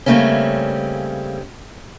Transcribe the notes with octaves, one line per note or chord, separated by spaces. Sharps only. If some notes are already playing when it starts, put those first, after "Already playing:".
C#3 G3 A3 A#3 C4 C#4